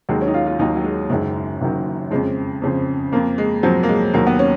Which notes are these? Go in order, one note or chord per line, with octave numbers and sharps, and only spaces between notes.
D#2 D#3 F#3 G#3
C#4
D#4
F4
F4
D#2 D#3 F#3 D#4
F#3
G#3
F#1 F#2 D#3 F#3 G#3
F#1 F#2 D#3 F#3
F2 C#3 F3 G#3
F2 C#3 F3
F2 F3 A#3
G#3
F2 F3 F#3
A#3
G#3
D#2 D#3 F#3 A#3
B3
C#4